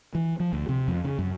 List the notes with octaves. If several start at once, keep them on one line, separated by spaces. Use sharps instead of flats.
E3
F3
D2
C3
F2
C#3
F#2